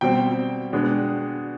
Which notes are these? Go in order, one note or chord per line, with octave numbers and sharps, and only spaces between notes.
B2 G3 C4 G5
B2 G#3 B3 D4